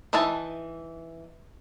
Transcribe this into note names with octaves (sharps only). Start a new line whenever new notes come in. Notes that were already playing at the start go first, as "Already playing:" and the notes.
E3 D#4 B4 E5 A5